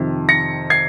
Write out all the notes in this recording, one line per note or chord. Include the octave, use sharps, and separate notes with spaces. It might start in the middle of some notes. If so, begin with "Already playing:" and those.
Already playing: F2 C3 D#3
A#6 C#7
G#6 C7